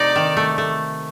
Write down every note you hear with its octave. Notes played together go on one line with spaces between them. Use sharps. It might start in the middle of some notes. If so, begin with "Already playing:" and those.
Already playing: C3 A3 D#4 D5
D#3
A3
A3